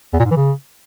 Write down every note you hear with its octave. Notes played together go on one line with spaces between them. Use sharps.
E2
A#2
G#2
E3
C#3